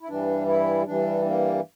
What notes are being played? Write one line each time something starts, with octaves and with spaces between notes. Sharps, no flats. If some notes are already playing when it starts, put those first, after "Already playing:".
E4
G2 E3 G3 D4
E4
G2 E3 G3 D4
A#3